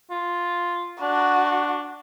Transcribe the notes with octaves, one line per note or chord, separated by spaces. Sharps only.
F4
D4 F#4